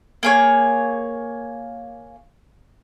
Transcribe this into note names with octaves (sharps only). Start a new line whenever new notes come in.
A#3 G#4 C#5